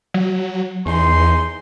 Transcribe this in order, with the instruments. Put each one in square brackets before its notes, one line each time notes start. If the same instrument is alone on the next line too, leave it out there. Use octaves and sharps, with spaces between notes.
[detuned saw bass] F#3
[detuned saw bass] E2 [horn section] D#4 G#4 C6